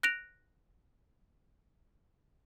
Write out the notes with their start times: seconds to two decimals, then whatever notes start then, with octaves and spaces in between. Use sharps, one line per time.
0.03 F#6 A#6 D7 F7